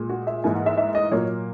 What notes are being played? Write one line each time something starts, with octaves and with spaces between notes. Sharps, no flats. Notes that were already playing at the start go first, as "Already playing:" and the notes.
Already playing: A#2 G#3
F#4
E5
G#2 E3 A#3 G#5
F#5
E5
E5
D#5
A#2 F#3 A#3 C#5